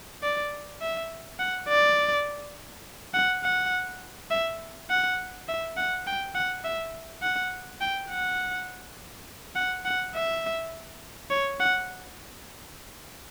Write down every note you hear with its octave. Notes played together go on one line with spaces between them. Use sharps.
D5
E5
F#5
D5
F#5
F#5
E5
F#5
E5
F#5
G5
F#5
E5
F#5
G5
F#5
F#5
F#5
E5
C#5
F#5